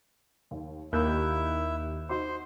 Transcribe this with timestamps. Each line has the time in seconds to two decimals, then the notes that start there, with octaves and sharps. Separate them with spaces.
0.51 D#2
0.93 D#2 A#3 E4 E5 F#6 G6
2.09 D#4 F#4 C5 C6